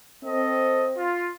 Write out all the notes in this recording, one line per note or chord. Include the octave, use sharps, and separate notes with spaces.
C4 A4 D#5
F4